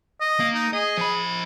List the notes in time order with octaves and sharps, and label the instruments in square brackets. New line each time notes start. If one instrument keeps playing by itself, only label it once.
[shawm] D#5
[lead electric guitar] A#3
[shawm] D#4
[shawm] G#4 [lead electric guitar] D#5
[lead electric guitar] F3 B5